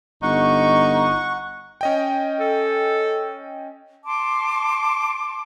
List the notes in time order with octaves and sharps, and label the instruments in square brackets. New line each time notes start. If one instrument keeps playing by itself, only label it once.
[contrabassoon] G1 [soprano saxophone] D#4 [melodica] F#5 [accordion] C#6
[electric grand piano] C#4 D#5 G5
[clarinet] A4
[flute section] A5 C6 D6